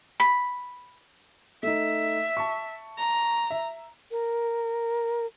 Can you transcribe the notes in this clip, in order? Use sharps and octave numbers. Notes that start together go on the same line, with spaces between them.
B5
A3 D#4 E5
A5 C#6
A#5
E5
A#4